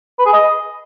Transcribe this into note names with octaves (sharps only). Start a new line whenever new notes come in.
B4
G#4
D#5